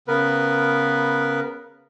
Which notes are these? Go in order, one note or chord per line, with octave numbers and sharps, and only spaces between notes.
C#3 B3 A#4 B4